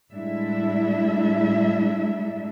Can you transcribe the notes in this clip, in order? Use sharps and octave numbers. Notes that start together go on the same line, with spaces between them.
A2 G3 G#3 D4 E4 E5